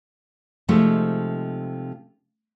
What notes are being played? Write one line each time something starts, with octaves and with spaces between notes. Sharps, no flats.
C3 F3 G#3 A3 D#4